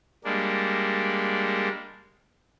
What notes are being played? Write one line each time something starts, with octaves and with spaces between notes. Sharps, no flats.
G3 G#3 A#3 D4